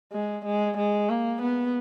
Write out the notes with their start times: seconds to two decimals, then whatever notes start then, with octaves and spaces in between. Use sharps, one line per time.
0.12 G#3
0.45 G#3
0.77 G#3
1.09 A#3
1.42 B3